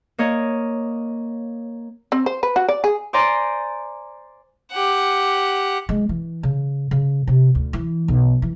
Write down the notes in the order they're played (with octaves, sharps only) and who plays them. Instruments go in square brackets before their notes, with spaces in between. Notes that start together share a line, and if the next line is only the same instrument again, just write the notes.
[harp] A#3 C#5 D#5
[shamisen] C4
C5
B4
F#4
D5
G#4
[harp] C5 D5 G#5 A#5 C6
[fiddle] G4 F#5
[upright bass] G#3
E3
C#3
C#3
C3
D2
E3
B1
E3